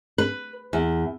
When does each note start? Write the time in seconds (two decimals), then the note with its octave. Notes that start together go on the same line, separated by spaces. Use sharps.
0.18 B4
0.73 E2